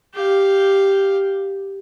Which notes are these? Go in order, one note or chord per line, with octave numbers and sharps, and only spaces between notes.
G4 F5